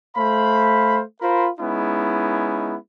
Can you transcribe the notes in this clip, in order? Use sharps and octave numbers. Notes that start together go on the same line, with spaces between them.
A3 C5 F5 B5
F4 A#4 C5 B5
G#3 B3 C#4 D#4 E4